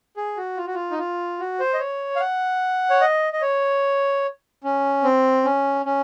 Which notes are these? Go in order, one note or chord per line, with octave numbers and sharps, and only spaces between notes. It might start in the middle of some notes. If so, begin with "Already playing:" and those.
G#4
F#4
F4
F#4
F4
D#4
F4
F#4
C5
D#5
C#5
F5
F#5
C#5
D#5
D#5
C#5
C#4
C4
C#4
C#4